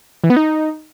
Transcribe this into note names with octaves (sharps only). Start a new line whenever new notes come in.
E3
B3
D#4